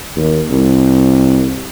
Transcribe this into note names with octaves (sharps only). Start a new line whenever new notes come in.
D#2
C2